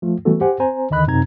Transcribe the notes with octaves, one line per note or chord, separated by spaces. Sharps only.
F3 A3 F4
E3 G3 A3 B3 F#4 A4
G4 C5 F#5 G#5
C4 C5 G#5 A#5
D#2 D3 D#3 D#5 B5 F#6
F#2 C3 C4 D#4 A#5 G#6